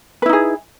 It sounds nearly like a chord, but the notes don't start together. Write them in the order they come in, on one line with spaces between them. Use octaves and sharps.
B4 E4 D#4 G#4